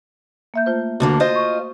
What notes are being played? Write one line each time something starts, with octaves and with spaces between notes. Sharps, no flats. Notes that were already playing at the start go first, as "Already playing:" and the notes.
A#3 E5 G6
A3 F4 C5
D2 D3 A#3 F#4
F4 C5 D#5
C#6